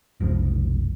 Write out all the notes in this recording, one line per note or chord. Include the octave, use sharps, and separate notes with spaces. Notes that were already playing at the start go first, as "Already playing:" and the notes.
F1 B1 F3